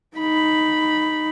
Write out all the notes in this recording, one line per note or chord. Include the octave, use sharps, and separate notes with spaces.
D#4 B5